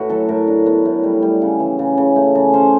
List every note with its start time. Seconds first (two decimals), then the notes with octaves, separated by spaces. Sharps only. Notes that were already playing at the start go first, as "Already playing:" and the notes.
Already playing: A2 F#4 B4
0.09 F#3 A4
0.29 A2 A#4
0.47 D4
0.66 B3
0.85 A2
1.04 G3
1.22 G3
1.42 C#3
1.60 E3
1.79 C#3
1.98 C#3
2.16 A3
2.35 C#3
2.54 C#4 C5